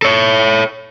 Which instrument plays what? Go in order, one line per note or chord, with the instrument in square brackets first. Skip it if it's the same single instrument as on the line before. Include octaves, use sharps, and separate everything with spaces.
[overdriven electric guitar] A4 C#5